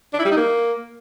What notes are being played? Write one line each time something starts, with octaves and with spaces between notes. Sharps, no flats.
D4
E4
G3
D#4
A#3